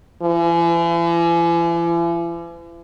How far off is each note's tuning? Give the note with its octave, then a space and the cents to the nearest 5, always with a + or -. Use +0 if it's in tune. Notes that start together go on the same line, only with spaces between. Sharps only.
E3 +45